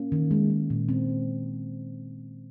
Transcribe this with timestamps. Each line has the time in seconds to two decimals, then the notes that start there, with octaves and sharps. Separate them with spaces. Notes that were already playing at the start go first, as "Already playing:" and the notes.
Already playing: A#3 C#4
0.12 D#3
0.31 G#3
0.50 G#3
0.70 A#2
0.89 G#3 C4
1.09 G#3